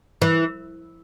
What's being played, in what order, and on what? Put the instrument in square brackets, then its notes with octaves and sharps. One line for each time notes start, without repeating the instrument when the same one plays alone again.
[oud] E3